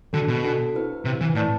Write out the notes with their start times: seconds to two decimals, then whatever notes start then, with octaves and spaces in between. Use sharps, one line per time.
0.13 D3 D4 F#4 A4
0.28 B2
0.44 D4 F#4 A4
0.74 C4 E4 B4
1.05 C3 C4 E4 B4
1.21 E3
1.35 A2 E4 B4 D5 A5